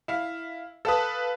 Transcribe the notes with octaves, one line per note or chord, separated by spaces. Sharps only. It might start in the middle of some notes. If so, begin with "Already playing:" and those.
E4 F5
A4 B4 F5 A5 D#6 E6